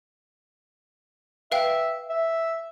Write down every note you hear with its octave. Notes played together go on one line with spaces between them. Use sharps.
B4 E5 F5 G5
E5